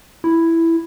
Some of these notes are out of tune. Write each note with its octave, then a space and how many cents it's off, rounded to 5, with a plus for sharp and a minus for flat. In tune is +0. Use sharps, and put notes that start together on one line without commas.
E4 +5